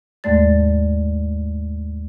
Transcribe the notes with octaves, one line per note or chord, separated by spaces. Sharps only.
D#2 G#2 G#3 A3 D5 A6